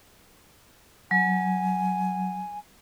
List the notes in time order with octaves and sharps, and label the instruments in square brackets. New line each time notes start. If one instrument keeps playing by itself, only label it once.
[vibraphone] F#3 [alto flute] G#5